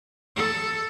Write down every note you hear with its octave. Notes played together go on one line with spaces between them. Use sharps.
A4